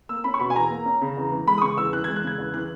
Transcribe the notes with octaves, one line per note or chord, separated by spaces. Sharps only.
A#3 E6
C#4 B5
C#6
B2 B5
G#5
E2 A#5
A#3
C#4
C#3
E2
E3
G#3 B5
D#6
C#3 C#6
E2 E6
E3 F#6
G#3 G#6
F#6
C#3 G#6
E2
E3 F#6